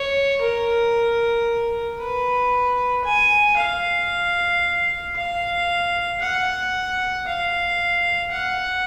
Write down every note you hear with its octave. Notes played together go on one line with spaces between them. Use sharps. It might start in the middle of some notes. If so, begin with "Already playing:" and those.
Already playing: C#5
A#4
B4
G#5
F5
F5
F#5
F5
F#5